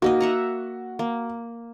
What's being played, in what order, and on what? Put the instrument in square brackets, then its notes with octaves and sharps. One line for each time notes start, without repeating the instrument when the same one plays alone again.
[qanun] A#3 D#4 D#5 [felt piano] F#4
[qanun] E5 F#5 A#5
A#3